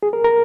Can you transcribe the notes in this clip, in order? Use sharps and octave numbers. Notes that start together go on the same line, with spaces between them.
G#4
A#4
A#4